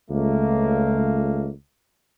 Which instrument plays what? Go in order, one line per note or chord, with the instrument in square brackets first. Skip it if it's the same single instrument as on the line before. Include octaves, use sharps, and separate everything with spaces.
[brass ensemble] C#2 A3 A#3